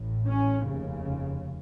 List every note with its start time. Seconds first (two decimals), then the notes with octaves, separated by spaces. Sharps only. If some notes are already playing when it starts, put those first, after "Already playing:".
Already playing: A1 A2
0.27 C#4
0.64 F1 D#2 C#3